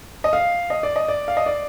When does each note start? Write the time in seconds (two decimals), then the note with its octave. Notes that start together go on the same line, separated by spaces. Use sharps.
0.24 D#5
0.33 F5
0.70 D#5
0.83 D5
0.96 D#5
1.08 D5
1.28 F5
1.37 D#5
1.46 D5